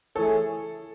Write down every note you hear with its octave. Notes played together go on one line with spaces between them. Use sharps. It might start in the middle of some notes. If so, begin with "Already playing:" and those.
E3 A3 E4 G#4 A4 C#5